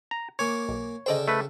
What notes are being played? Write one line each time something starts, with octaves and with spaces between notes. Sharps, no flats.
A#5
A#3 C#5 G#5 D6
B1
C#3 A4 C5 D5 D#5 G5
A3 B4